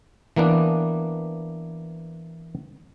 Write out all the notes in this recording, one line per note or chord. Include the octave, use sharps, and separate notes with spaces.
E3 A#3 B3 D4